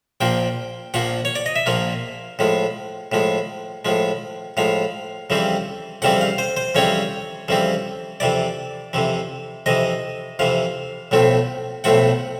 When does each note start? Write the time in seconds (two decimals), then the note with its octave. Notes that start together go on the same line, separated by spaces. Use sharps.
0.21 A#1 A#2 F3 A#3 G5
0.94 A#1 A#2 F3 A#3 F#5
1.25 C#5
1.35 D5
1.46 D#5
1.56 E5
1.66 A#1 A#2 F3 A#3 F5
2.39 A2 F3 G#3
3.12 A2 F3 G#3
3.85 A2 F3 G#3
4.57 A2 F3 G#3 F5
5.30 F2 C#3 E3 G3 C4
6.02 F2 C#3 E3 G3 C4 F#5
6.21 F5
6.38 C5
6.57 C5
6.75 F2 C#3 E3 G3 C4 C#5
7.48 F2 C#3 E3 G3 C4
8.20 F2 C3 E3 D5
8.93 F2 C3 E3
9.66 F2 C3 E3 D#5
10.39 F2 C3 E3 F5
11.11 B1 A2 F3 A3 C4
11.84 B1 A2 F3 A3 C4 F#5